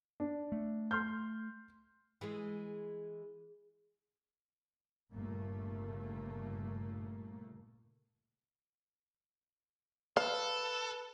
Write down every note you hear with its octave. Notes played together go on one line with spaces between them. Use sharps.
D4
A3
C6 F6 G6
E3 G#3 G#4
G1 A#2 C#3 A3 A#3
A4 B4 F5